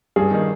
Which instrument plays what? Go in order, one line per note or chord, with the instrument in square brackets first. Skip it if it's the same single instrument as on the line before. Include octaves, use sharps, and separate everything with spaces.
[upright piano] G2 [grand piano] G#4
[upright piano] D#3 A#3 D#4